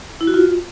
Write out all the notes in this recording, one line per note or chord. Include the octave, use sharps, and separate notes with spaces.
E4
F#4
F4